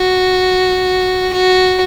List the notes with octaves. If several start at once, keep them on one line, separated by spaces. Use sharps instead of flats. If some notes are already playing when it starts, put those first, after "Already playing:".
Already playing: F#4
F#4